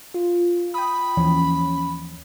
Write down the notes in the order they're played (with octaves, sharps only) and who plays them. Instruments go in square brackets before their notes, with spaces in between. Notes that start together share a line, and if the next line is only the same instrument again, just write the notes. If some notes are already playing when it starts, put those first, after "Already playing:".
[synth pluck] F4
[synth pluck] G5 D#6 [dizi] B5
[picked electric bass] D#2 E3 F3 [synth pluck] C#4